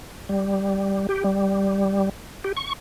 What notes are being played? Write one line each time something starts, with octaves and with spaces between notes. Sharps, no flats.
G3
G4
G3
G4
C#6